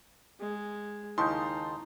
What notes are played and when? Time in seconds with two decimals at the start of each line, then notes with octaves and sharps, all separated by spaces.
0.40 G#3
1.18 D#2 C#3 D#4 E4 A5 C6 D#6 G6